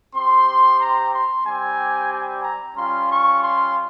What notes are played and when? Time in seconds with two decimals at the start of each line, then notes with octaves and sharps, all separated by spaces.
0.14 C4 G4 C6
0.80 A#5
1.13 C6
1.45 G3 C4 G4 G#5
2.11 G#5
2.44 A#5
2.76 G3 C#4 F4 C6
3.09 C#6
3.42 C6